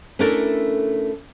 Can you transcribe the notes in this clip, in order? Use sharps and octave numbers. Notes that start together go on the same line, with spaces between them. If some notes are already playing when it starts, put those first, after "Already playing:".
A3 C#4 D4 E4 A4 A#4